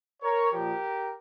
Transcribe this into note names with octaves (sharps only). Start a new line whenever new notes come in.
A#4 C#5
A#2 F3 G4 A#4